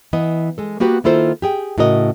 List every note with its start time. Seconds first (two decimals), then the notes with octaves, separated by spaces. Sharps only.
0.13 E3 B3 D#5
0.58 G#3 A4
0.80 A#3 B3 F#4 G4 B4
1.04 D#3 A#3 E4 F4 A4 C5
1.42 G4 G#4 G5
1.78 A2 C#3 F#4 A#4 D#5